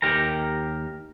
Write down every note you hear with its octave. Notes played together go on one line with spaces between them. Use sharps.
D#2 G4 A#4 A#5